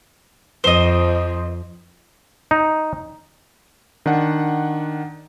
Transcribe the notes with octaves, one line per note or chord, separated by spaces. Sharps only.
F2 F3 C5 D#5
D#4
D#3 D4 F#5